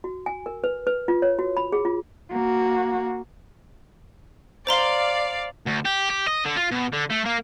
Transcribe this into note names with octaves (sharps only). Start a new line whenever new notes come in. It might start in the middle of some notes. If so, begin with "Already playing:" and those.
F#4
G#5
A#4
B4
B4
F4
C#5
F#4
B5
G#4
F4
A#3 F#4
C5 D5 F5 A#5 C6
D2
G4
G4
D#5
D3
F4
B2
D3
A3
A#3